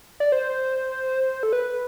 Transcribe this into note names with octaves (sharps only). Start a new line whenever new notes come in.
D5
C5
A4
B4